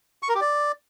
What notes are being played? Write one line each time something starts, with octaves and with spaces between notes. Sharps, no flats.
C#6
A#4
G4
D5